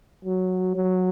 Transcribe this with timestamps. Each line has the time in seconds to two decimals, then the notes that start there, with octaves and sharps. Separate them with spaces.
0.24 F#3
0.75 F#3